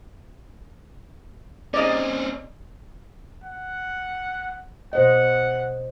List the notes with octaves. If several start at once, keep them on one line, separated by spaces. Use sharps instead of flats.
C4 C#4 D5 D#5
F#5
B2 C5 D#5 F#5